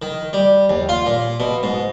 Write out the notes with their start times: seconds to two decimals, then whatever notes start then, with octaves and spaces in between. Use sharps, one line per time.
0.02 D#3
0.33 G3
0.70 D#2
0.89 F4
1.06 A#2
1.40 B2
1.63 G#2